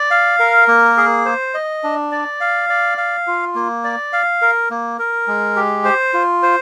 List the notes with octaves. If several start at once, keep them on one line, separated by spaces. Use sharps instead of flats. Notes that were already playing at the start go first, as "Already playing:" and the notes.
Already playing: D5
F5
A#4
A#3
G#4
C5
D#5
D4
D5
F5
D5
F5
F4
A#3
D5
F5
A#4
A#3
A#4
G#3
G4
C5
F4
C5